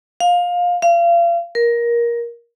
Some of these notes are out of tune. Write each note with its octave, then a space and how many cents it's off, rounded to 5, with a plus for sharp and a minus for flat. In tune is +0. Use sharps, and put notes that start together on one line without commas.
F5 +20
F5 -35
A#4 +15